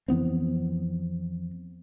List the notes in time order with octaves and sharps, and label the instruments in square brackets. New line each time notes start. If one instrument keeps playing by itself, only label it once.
[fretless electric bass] F2 E3 B3 C4